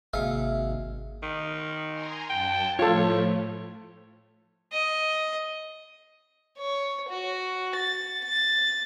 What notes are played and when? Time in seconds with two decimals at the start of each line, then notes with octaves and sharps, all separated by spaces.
0.13 G#1 C3 G#3 A#3 F#4 E5 F5
1.23 D#3
1.91 G#5 A#5 C6
2.30 F#2 G5 A5
2.79 A2 F3 A3 F4 A4 C#5
4.72 D#5
6.59 C#5
7.10 F#4
7.76 A6
8.25 A6